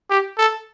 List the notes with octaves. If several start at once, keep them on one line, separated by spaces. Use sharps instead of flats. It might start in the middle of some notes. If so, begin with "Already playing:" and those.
G4
A4